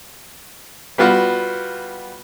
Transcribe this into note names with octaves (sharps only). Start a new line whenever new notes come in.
G3 B3 F4 F#4